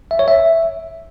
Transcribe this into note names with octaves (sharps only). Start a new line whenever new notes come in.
E5
C#5
E5